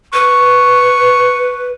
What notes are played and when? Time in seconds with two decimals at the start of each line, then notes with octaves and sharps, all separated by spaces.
0.14 B4 C#6